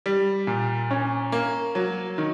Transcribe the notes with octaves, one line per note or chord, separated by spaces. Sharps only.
G3
A#2
C#4
A#3
F#3
D#3